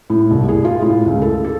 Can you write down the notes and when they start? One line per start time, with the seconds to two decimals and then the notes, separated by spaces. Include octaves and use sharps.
0.10 A2
0.31 C2
0.49 G#4
0.65 F4
0.82 A2
1.06 C#2
1.22 A4
1.45 A4